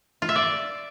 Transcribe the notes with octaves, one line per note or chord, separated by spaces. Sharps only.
F4
E5
D5